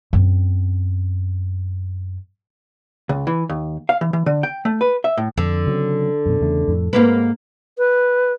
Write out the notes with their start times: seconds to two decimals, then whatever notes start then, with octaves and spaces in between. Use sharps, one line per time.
0.13 F#2 C4
3.09 C#2
3.27 E3
3.49 D#2
3.89 F5
4.01 E3
4.13 E3
4.26 D3
4.43 G5
4.65 A3
4.81 B4
5.04 E5
5.17 A2
5.37 F2 D3
5.66 C#3 F#3 C4
6.26 F#2 B2
6.41 E2 C#3 A3
6.68 F2 A2
6.93 G#2 G#3 A#3 C4 B4
7.78 B4